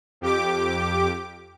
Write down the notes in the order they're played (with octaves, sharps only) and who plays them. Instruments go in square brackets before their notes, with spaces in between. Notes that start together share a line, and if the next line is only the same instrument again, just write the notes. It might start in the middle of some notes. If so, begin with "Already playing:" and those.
[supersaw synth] F2 G4 D6